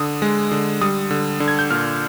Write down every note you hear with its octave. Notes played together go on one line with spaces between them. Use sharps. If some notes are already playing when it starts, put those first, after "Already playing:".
Already playing: D3 D#6
G#3
D3
G3 D#6
D3
D3
G#6
G6
A#2 F6